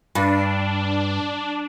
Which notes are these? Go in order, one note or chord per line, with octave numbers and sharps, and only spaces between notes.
G2 D4